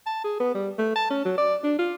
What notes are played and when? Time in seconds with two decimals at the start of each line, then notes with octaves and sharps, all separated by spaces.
0.06 A5
0.24 G#4
0.40 B3
0.55 G3
0.78 A3
0.96 A5
1.10 C#4
1.25 F#3
1.38 D5
1.64 D4
1.79 F4